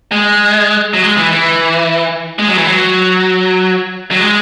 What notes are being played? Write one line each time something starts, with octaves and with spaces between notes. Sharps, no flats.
G#3
F#3
G#3
E3
E3
G#3
F#3
E3
F#3
F#3
G#3